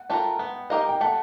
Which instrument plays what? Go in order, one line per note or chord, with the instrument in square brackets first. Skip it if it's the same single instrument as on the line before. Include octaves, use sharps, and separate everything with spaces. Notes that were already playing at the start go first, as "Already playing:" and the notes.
Already playing: [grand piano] F#5
[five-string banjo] A3 D4 F4 A#4 [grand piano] G5
[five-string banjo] B3 [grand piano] F#5
[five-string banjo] D#4 G4 A#4 D#5 [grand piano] F5
[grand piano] G5
[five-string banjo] A3 [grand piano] F#5